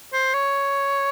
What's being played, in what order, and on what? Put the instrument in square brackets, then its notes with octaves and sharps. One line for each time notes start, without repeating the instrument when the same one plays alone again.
[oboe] C5
C#5